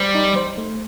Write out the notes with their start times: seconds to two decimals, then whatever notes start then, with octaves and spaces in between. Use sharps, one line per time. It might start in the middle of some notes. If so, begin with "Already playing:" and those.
Already playing: G3 C5
0.15 D#4
0.36 C5
0.58 A3